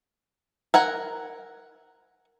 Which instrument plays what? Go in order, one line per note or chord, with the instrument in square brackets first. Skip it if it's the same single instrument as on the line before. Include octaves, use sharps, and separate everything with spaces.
[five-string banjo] A#4 F#5 G#5